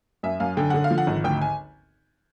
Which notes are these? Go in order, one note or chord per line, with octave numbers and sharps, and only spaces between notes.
F#2 E5
F#2 F5
D3 G5
D3 F#5
F5
F3
F#5
G#1
D2 G5
G#5